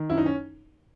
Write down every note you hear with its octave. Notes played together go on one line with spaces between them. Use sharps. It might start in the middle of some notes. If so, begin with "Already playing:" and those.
Already playing: D#3
F#2 E4
D#4
C#4